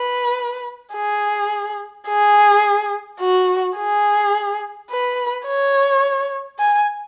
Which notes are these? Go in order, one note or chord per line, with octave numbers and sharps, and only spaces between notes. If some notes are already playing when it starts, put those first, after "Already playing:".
Already playing: B4
G#4
G#4
F#4
G#4
B4
C#5
G#5